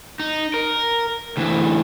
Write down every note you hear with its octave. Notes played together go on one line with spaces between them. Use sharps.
D#4
A#4
D2 E3